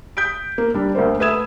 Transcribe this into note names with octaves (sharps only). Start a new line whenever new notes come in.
D#6 G6 B6 D7
A#3
G3 D4
D2 A#3 C5
A3 B4 E5 D#6 G#6 E7